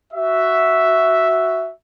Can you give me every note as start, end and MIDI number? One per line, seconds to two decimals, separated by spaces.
0.13 1.70 66
0.13 1.70 76